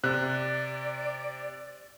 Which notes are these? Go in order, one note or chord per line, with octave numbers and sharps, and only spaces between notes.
C3 D5 F#6